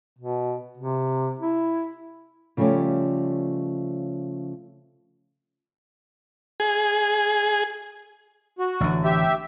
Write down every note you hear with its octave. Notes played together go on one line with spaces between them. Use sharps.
B2
C3
E4
C#3 F3 G3 A3 C#4 G4
G#4
F#4
A1 D3
G4 E5